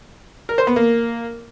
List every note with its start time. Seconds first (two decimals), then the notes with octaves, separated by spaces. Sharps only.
0.49 A#4
0.58 C5
0.67 B3
0.76 A#3